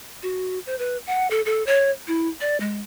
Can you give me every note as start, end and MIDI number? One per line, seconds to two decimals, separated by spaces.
0.23 0.59 66
0.66 0.76 72
0.79 0.97 71
1.07 1.28 78
1.31 1.41 69
1.46 1.65 69
1.67 1.91 73
2.08 2.28 64
2.41 2.57 74
2.60 2.81 56